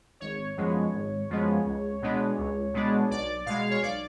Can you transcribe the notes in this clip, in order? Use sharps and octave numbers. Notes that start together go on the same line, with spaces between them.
G#1 C#5
F#2 F3 G#3 B3
G#1
F#2 F3 G#3 B3
C#2
B2 G#3 B3 D4
C#2
B2 G#3 B3 D4
B1 D5
B2 G#3 F5
C#5
B1 D5